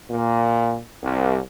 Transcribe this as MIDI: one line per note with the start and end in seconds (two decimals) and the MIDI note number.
0.11 0.77 46
1.02 1.39 36